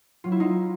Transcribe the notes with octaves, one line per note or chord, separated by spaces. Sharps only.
F#3 F4
E4
D#4 F4